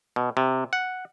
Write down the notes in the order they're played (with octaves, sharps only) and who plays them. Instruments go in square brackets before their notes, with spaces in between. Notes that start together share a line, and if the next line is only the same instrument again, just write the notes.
[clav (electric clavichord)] B2
C3
F#5